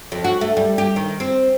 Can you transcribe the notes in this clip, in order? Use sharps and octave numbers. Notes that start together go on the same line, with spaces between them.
F2
F#4
A3
G3
G4
D#3
C4